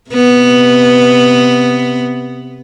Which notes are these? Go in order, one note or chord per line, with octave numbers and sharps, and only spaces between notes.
C3 B3